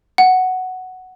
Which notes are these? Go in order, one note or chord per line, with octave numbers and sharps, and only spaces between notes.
F#5